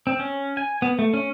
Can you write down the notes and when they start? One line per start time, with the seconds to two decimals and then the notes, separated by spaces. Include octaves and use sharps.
0.07 C4
0.19 C#4
0.57 G#5
0.82 B3
0.99 A3
1.14 C#4